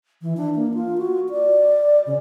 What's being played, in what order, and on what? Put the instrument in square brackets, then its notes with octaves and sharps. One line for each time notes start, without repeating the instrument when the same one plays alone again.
[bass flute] E3
D4
A#3
F4
F#4
D5
C#3